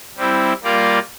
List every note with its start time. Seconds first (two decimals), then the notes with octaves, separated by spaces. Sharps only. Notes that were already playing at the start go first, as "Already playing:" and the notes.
0.17 G3 C4 E4
0.63 G3 A#3 F4 A#4 D5